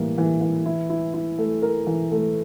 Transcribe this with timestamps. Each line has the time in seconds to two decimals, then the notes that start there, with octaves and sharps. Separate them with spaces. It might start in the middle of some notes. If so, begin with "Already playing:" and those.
Already playing: A2 E3 G3 A#3
0.18 E3
0.41 E3
0.66 E4
0.90 E4
1.14 E4
1.38 A3
1.62 A#4
1.87 E3
2.12 A3